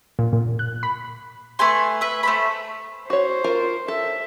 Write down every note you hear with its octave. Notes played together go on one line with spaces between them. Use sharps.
A#2
A#2
F#6
B5
A3 B4 G#5 C6
B4 E5
A3 C5 B5
F#4 C5 C#5
F4 A#4
A4 E5